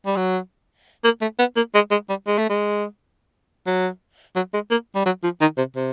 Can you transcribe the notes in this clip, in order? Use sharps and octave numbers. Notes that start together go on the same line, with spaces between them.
G3
F#3
A#3
A3
B3
A#3
G#3
G#3
G3
G#3
A3
G#3
F#3
F#3
G#3
A#3
G3
F#3
F3
D#3
C3
C3